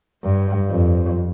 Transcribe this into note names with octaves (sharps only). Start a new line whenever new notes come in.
G2
F2